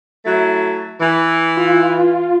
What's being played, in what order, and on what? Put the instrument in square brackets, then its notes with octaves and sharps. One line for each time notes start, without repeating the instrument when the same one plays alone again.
[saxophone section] F#3 A3 E4
E3
[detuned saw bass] F4